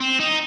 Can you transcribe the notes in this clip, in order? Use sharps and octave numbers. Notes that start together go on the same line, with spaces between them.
C4
D#4